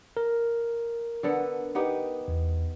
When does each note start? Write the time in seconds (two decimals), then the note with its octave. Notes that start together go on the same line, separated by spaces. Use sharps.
0.17 A#4
1.23 D3 B3 A4
1.75 B3 D#4 G4
2.28 E2